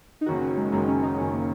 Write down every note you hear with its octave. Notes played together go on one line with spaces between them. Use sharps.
D#4
F#1 F#2 D#3 F#4
C#4
G#3
F#1 F#2 D#3 G#3
C#4
D#4
F#1 F#2 D#3 C#4
A#3